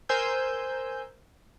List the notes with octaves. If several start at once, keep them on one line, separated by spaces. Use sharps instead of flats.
A#4 C5 G#5 E6 G6